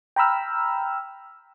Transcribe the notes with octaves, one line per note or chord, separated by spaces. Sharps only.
G5 A#5 B5 E6 F6